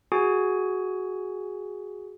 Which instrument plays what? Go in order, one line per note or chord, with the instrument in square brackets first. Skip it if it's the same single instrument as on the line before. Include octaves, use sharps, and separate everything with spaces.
[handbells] F#4 G#4 G#5